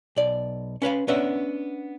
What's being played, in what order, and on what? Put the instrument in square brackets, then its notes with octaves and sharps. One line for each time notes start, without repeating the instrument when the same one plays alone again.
[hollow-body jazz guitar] B1 D5
C#4 B4 F5 B5
B3 C#4 D4 B4 E5 F#5